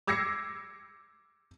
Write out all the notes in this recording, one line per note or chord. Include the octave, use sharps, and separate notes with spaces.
D6 E6 G#6 A#6 C7 C#7